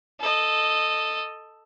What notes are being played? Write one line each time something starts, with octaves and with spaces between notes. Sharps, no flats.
A4 D#5